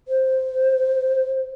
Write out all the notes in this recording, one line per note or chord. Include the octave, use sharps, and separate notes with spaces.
C5